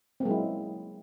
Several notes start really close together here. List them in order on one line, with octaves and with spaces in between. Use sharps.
C4 A#3 G#3 F#3 E4